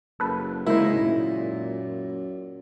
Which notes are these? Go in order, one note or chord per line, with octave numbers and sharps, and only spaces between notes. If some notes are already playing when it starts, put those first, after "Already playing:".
F#1 A4 B4
F#2 C#3 G#3 A#3 D#4 E4 C5
A#2